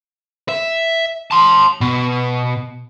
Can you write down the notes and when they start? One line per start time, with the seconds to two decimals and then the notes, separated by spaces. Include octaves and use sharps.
0.49 E5
1.31 A5 C6
1.81 B2